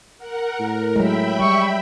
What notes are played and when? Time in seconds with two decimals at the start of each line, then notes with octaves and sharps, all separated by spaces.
0.18 A#4 F#5
0.60 A2 A#4
0.96 F#3 G#3 E5 G5 B5
1.40 G3 C#6